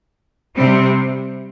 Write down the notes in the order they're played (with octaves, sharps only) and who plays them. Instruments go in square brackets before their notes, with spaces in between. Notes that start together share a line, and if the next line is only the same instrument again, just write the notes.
[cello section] C3 G3 C4